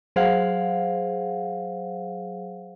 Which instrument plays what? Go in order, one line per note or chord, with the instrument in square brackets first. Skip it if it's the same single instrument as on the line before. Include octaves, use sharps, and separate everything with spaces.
[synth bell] F#3 G#4 C5 F5 F#5